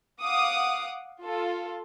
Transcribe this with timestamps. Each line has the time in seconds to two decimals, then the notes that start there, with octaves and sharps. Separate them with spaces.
0.20 F5 F#5 D6 D#6
1.22 F4 A4